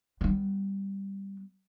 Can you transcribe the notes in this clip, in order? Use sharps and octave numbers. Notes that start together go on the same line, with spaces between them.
G3 B3